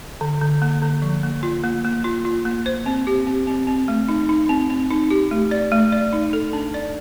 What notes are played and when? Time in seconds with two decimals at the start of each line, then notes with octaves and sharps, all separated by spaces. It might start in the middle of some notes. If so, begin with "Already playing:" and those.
0.21 D3
0.41 D3
0.62 A#3
0.82 D3
1.02 F3
1.23 A#3
1.43 F4
1.64 A#3
1.84 A#3
2.04 F4
2.25 F4
2.45 A#3
2.66 C5
2.86 C4
3.07 G4
3.27 C4
3.47 C4
3.67 C4
3.88 A3
4.08 D#4
4.29 D#4
4.49 C4
4.70 C4
4.90 D#4
5.11 G4
5.31 A3
5.51 D5
5.72 A3
5.92 D5
6.13 D#4
6.33 A4
6.53 D4
6.74 D5